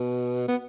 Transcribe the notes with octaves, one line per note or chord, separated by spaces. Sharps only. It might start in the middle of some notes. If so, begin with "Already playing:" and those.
Already playing: B2
B3